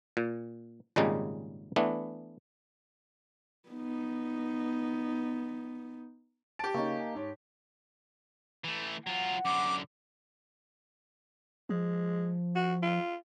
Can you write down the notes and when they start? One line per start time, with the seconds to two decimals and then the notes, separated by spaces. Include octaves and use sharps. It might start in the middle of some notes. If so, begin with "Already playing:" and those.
0.17 A#2
0.96 G#1 A#2 C#3 G3 G#3 D#4
1.76 E3 A3 B3 D4
3.69 B3 D#4
6.59 G4 A5 D7
6.74 C#3 A#3 D#4 C#5 C#6
6.99 G#5
7.15 G#2 C#5
8.64 E3 A3
9.07 F#3 F4 F#5
9.45 F#2 D3 D6
11.69 F3 G#3
12.55 F#4
12.82 F4